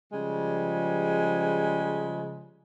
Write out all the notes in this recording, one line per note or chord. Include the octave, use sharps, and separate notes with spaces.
C#3 F3 G3 G#3